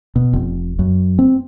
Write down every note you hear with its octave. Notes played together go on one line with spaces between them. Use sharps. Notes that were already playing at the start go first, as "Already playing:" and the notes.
B2
F1
F#2
C4